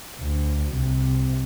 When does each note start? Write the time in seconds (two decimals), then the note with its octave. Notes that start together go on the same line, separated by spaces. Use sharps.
0.19 D2
0.72 C2 C3